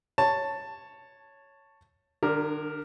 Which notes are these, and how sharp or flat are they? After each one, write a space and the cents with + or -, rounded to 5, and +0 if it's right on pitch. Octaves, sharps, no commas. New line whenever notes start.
C#5 +0 A5 +10
D3 +45 D4 +0 A#4 +0